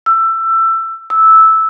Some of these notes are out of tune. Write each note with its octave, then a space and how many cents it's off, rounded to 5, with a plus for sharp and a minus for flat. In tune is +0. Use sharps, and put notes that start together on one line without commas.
E6 +20
E6 -10